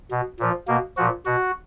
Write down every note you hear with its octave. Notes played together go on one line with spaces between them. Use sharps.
B2
A#2 F3
B2 A#3
A#2 F3 F#4
B2 F#4